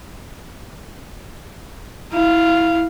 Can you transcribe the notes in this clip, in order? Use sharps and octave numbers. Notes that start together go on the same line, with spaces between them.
E4 F5